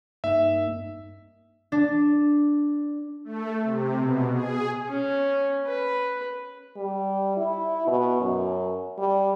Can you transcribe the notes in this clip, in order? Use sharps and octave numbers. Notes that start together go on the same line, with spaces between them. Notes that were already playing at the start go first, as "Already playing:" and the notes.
G2 A#3 D#4 E5
D4
A3
C3
B2
G#4
C#4
B4
G3
E4
B2
F#2
G3